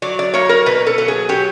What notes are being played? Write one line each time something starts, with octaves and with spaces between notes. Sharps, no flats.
F#3 D5
D5
A#3 C#5
A#4
B2 B4
A4
F#3
G#4
F#3 G4